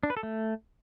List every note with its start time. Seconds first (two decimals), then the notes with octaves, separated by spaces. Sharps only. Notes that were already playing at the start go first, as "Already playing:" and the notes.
0.03 D4
0.10 B4
0.17 A4
0.23 A3